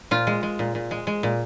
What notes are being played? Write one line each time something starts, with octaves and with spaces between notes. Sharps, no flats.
A#2 F4
G#3
G#3
A#2
A#2
G#3
G#3
A#2